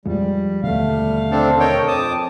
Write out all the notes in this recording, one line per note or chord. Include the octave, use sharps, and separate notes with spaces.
F2 F3 G3 G#3
D#2 B2 D3 A3 F5
G3
C4 D4 A4
A4 A#4 C#5 D#5 G5
F2 C4 A5 D6 D#6